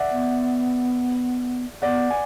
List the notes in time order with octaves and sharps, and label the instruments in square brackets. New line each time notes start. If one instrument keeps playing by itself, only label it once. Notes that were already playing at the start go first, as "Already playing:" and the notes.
Already playing: [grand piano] D5 E5 F#5
[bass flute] B3
[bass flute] B3 [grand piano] D5 F#5
[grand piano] G#5